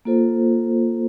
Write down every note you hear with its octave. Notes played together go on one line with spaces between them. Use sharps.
A#3 F4 A4 C5